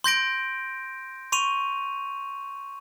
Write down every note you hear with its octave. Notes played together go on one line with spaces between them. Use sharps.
C6 G6 A#6 D7
C6 C#6 D#7 F7